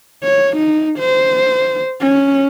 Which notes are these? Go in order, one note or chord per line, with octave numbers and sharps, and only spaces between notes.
C#5
D#4
C5
C#4